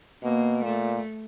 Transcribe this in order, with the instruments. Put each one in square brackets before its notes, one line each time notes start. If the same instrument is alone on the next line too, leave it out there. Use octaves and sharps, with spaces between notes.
[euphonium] B2 [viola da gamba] A#3
[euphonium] A#2 [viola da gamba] A3